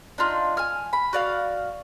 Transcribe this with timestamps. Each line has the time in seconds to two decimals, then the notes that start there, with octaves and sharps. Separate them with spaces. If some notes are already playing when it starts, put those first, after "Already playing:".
0.18 D4 D#4 F4
0.57 G#5 F6
0.93 B5
1.13 F#4 D5 F5